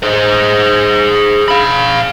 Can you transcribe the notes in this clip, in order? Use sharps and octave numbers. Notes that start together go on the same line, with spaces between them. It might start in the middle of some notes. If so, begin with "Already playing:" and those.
G#4 C5
F5 B5